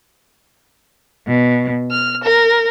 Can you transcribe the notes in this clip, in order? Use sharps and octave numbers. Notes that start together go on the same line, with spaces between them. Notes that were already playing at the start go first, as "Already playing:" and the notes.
B2
F6
A#4